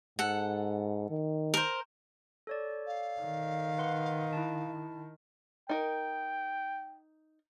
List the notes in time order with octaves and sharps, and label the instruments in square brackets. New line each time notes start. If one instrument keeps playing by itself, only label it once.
[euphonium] G#2 [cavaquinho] A4 F#5
[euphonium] D#3
[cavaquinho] A#4 C5
[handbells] A4 C#5 D5
[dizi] F5
[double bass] D#3
[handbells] B4 F#5 C6
E4 A5
[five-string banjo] D#4 A#4 [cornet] G5